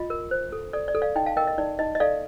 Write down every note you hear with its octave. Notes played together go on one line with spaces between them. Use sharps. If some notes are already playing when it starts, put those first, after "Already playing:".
Already playing: F4 D#5
A#4
C5
A4
A4 D5
D5
A4
D5 F5
D#4 D#5 G5
F5 A5
A#4 D#5 G5
D#5
D#4 D5
D#4 D#5
D#5
A4 D5 F5